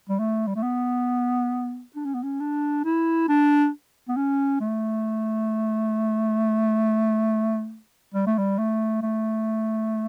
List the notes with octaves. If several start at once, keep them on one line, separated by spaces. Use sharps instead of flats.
G3
A3
G3
A3
B3
D4
C#4
B3
C#4
D4
E4
D4
B3
C#4
A3
G3
A3
G3
A3
A3